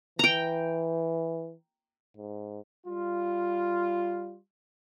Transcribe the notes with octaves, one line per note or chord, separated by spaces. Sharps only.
E3 G5 A#5
G#2
G3 F4